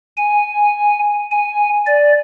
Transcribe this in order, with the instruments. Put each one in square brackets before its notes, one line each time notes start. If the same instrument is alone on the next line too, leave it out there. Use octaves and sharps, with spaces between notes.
[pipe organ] G#5
G#5
D5